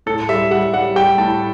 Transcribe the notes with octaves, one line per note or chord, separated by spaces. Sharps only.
A2 A4
G3 E5
G3 F#5
G3 F#5
G3 G5
A2 A5